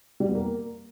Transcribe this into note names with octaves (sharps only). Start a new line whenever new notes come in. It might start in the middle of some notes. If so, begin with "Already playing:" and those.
G3
B3
A#3